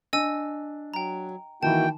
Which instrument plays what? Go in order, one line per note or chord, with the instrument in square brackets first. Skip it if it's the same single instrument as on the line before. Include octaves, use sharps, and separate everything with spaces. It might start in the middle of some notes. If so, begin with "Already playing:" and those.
[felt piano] D4 [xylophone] D#5 G#5 E6
[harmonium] F#3 [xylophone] G5 A#5
[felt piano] D#3 E3 [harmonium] A#3 E4 F#4 [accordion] G5 [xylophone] A5